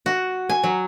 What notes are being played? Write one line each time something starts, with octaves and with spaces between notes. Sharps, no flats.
F#4
G#5
F#3